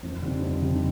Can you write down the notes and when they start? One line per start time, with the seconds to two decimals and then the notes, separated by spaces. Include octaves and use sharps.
0.03 F2
0.22 D3 G3 C4 D#4
0.42 F2
0.62 D3 G3 C4 D#4